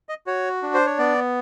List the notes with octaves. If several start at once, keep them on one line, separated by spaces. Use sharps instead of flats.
D#5
F#4 C#5
D4
C5
C#5
B3 D5